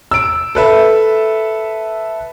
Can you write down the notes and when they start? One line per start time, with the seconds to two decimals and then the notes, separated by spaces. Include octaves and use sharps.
0.11 E6 D7
0.55 A4 B4 E5